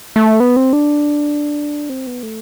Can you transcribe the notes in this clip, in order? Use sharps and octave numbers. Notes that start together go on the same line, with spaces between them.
A3
B3
C4
D4
C4
B3
A3